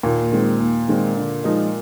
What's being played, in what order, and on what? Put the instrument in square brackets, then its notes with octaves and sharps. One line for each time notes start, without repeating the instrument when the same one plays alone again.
[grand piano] D#2 [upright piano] A#2
[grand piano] D#3 G#3 C4
D#2
D#3 G#3 C4
D3
F3 G#3 D#4 A#4